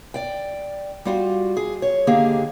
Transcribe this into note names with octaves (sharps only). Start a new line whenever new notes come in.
D5 G5
G3 F4 F#4
G#4
C#5
D3 D#3 A#3 G4 G#4